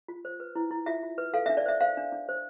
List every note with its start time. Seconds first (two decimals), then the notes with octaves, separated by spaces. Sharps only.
0.08 F4
0.25 C5
0.40 B4
0.56 E4
0.71 E4
0.86 F4 E5
1.03 F4
1.18 B4
1.33 A4 F5
1.46 D4 E5
1.57 D5
1.66 C5 E5
1.81 C5 F5
1.97 D4
2.12 D4
2.29 C5